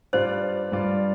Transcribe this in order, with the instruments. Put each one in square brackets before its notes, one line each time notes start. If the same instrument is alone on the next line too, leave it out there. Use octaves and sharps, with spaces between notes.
[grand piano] G2 G3 F4 D5 [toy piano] C5
[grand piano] G2 G3 F4 D5